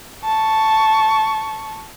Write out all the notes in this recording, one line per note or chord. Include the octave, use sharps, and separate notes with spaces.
A5 C#6